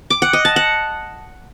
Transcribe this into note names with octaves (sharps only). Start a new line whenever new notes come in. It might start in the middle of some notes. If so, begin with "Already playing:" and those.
D6
F#5
D#5
A5
F#5